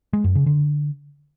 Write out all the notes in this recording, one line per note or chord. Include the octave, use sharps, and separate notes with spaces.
G#3
F#2
C#3
D3